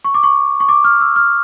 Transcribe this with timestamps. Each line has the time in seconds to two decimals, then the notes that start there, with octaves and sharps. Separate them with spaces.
0.04 C#6
0.14 D6
0.23 C#6
0.60 C#6
0.69 D6
0.84 F6
1.01 E6
1.16 F6